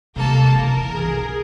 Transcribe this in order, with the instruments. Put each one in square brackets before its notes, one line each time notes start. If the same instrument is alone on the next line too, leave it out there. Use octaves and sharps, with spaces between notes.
[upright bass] C3 G#3 [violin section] A#3 A4 A5
[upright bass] C#3 E3 [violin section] A#4
[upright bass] B1 [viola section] G#4